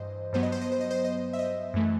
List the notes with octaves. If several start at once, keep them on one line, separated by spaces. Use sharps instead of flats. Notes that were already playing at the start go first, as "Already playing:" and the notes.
Already playing: G2 E3 C5 D#5
G2 F#3 B3 C5
D#5
C5
D#5
C5
D#5
C5
D#5
E5
D#5
F#2 E3 A3